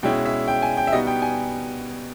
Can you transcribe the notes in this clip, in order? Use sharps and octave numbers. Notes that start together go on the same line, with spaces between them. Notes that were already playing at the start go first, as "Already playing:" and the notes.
B2 G#3 C#4 E4 G5
E5
G5
G#5
G5
E5
B2 G3 B3 D#4 D#5
G5
G#5